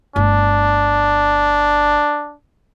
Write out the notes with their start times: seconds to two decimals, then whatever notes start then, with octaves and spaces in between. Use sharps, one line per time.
0.16 G1 A3 D4